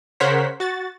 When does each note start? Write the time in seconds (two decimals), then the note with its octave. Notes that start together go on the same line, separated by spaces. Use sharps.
0.20 C#3 A#4 C5 C#5 F#5 B6
0.60 F#4 A6